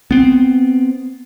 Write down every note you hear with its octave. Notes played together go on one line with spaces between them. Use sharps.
B3 C4